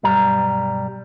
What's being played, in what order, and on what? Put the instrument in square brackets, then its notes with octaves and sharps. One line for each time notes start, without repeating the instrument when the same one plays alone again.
[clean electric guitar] B1 G2 G3 A#5